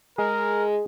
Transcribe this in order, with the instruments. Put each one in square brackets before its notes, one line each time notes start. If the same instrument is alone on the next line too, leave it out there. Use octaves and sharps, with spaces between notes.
[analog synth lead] G#3 [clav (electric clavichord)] G#4 [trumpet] A#4